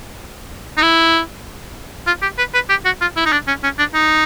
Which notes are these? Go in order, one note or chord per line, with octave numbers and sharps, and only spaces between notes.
D#4
E4
F4
G4
B4
B4
G4
F#4
F4
E4
D#4
D4
C#4
C#4
D4
D#4